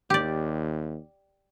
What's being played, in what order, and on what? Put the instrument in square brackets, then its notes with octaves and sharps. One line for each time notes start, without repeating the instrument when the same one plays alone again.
[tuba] D#2 [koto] G4 D5